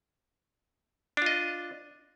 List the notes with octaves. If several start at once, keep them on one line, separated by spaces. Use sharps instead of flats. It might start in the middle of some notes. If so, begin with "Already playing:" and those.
D4 F4 D#5